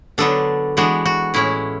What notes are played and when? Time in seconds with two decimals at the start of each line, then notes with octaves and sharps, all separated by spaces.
0.18 D3 F#3 B3 D4 A4
0.77 E3 G#3 B3 D4 F#4
1.06 F#4
1.34 A2 G#3 C#4 E4